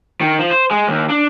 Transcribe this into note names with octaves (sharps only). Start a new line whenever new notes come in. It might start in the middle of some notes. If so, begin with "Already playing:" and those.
D#3
F3
C5
G#3
D#2
D4